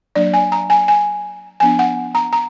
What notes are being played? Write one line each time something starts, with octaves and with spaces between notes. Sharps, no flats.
F#3 A#3 D4 D5
G#5
A#5
G#5
G#5
F3 B3 D4 G#5
F#5
A#5
A#5